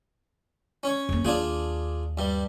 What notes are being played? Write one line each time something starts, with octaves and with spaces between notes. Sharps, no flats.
C#4 C#5
F2 A#3
D#2 D4 F4 G#4
G2 G3